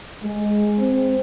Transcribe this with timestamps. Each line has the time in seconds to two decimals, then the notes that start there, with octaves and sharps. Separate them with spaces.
0.23 G#3
0.78 C4